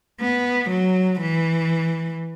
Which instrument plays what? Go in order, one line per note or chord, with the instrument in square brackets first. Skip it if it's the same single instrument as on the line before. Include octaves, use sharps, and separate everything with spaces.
[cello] B3
F#3
E3